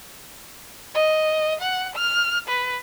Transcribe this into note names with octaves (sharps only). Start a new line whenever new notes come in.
D#5
F#5
F6
B4